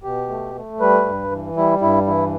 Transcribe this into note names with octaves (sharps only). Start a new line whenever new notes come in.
B2 G4
A3
A3
G3 B4
G2
E3
G3 E4
G2 E4
E3 E4